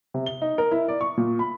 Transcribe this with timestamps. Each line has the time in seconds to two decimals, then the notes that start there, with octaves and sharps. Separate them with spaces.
0.14 C3
0.26 G7
0.42 D#4
0.58 A#4
0.71 E4
0.88 D5
1.01 C#6
1.17 A#2
1.39 B5